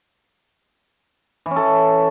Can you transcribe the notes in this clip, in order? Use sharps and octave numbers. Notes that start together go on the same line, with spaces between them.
E3
C#4
A4